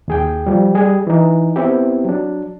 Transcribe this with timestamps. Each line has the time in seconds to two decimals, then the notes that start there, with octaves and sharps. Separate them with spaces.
0.08 D#2 G#4 G5
0.47 F3 G3
0.75 G3 G#4
1.07 E3 D#4
1.56 B3 C4 E4 G4
2.05 F#3 D4